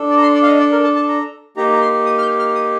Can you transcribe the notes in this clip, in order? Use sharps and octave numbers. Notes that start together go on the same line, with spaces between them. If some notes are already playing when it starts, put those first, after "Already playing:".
Already playing: D4 A4
D5
A#5
C6
D5
F5
D#5
D5
A#4
A5
A5
A#5
A#3 D#4 G4 A#5
A#5
C6
D#6
F6
G6
F6
D#6